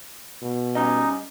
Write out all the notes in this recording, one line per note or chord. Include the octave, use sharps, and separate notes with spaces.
B2
G3 C#4 D#4 D#5